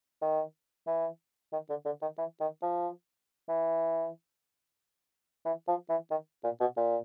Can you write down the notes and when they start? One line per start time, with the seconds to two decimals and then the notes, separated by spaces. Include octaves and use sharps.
0.22 D#3
0.87 E3
1.53 D#3
1.69 D3
1.86 D3
2.02 D#3
2.18 E3
2.40 D#3
2.62 F3
3.49 E3
5.45 E3
5.68 F3
5.90 E3
6.11 D#3
6.44 A#2
6.61 B2
6.77 A#2